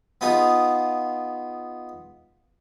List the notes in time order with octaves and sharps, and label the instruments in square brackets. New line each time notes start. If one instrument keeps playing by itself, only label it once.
[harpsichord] B3 D#4 F4 G#4